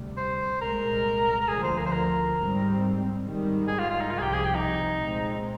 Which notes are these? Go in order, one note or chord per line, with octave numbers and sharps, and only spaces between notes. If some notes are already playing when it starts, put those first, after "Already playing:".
Already playing: D2 C3 G3
C5
C2 A#2 G#3 A#4
A#4
D2 D3 F3 G#4
C5
A#4
C5
A#4
G#2 G3 C4
G#2 D#3 G3
G#4
F4
F4
D#4
C2 C3 F3 F4
G#4
G4
G#4
G4
D#4
A#2 G#3 C4